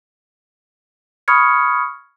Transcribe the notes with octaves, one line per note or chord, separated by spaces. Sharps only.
B5 C#6 D#6 F6 G#6 C#7